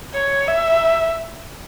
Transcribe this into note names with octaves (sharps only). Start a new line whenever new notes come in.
C#5
E5